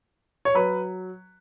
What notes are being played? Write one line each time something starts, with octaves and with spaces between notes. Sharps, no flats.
C#5
F#3 B4